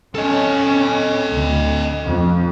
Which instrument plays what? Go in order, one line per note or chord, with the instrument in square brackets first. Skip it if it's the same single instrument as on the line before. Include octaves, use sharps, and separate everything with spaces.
[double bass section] C#4 [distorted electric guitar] A4 D#5
[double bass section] D2
F2